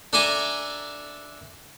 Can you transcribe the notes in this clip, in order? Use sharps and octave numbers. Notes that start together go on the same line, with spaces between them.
D4 A4 D5 E5 G#5 A#5